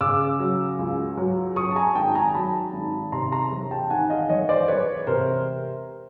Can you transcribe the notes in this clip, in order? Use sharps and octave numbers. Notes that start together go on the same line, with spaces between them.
C#3 D6 E6
F#3
C#2
F#3
F#3 C#6 D#6
A5
G#5 A#5
G#1 G5 A5
G#5 A#5
F#3 A5 B5
G#1
C3 A#5 C6
A#5 C6
E1
G5 A5
D#3 F#5 G#5
D#5 F5
E1 C#5 D#5
C5 D5
E1 B4 C#5
C3 A#4 C5